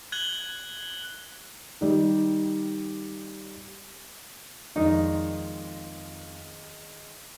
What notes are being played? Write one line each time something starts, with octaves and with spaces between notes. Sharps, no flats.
F#6 G#6 F#7 G7
D#3 G3 G4
F2 D#3 G#3 D#4 D5